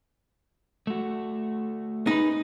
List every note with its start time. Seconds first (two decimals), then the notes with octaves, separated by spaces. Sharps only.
0.87 A3 F#4
2.07 D#4 G#4 B4